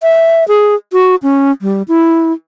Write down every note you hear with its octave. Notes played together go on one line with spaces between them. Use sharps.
E5
G#4
F#4
C#4
G3
E4